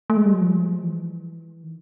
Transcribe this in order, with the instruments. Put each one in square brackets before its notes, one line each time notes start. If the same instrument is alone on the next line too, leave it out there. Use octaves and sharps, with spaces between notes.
[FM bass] A3
G#3
G3
F#3
F3
E3
D#3